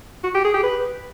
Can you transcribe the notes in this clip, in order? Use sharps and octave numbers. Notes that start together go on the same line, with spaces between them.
F#4
G4
G#4
G4
B4